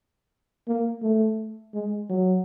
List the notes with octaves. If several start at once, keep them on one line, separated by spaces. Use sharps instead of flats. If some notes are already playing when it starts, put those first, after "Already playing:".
A#3
A3
G#3
F#3